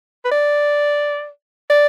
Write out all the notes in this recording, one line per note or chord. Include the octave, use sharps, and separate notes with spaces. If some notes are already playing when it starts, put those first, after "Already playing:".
B4
D5
D5